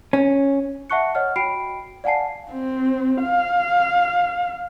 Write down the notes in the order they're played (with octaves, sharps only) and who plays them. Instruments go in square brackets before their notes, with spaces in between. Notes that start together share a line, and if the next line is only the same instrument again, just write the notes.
[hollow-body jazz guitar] C#4
[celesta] E5 F#5 A5 C#6 F#6 C#7
C#5 D#5 F#5 F6
F#4 G5 B5 C7 D7
D5 F5 F#5 G#5 A5 C7
[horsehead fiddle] C4
F5